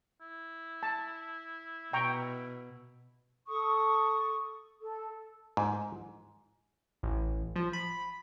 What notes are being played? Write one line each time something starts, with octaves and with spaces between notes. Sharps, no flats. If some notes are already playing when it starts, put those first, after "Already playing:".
E4
A5
B2 G5 A#5 C#6
A4 C#6 D#6
A4
G#2
A1
F3
B5